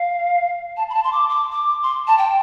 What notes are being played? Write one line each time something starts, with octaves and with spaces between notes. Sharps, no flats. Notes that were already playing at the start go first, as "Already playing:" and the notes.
Already playing: F5
A5
B5
A5
C6
D6
D6
D6
C6
A5
G5